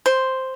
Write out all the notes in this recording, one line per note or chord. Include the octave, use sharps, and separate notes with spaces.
C5